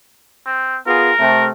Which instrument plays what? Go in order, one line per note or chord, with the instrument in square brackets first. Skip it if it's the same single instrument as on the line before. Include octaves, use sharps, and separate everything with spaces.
[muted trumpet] C4
[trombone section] B3 F4 G#4 [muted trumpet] A#4
[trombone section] C3 A3